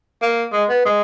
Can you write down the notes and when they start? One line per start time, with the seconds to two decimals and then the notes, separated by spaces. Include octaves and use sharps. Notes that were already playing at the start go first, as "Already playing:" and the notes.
0.22 A#3
0.53 G#3
0.69 B3
0.85 G#3